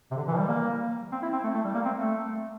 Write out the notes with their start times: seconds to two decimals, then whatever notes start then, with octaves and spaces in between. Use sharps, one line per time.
0.11 C3
0.17 D3
0.27 E3
0.34 F3
0.38 G3
0.48 A#3
1.12 C4
1.22 E4
1.33 C4
1.44 A3
1.54 A3
1.65 G3
1.74 A#3
1.85 C4
1.96 A3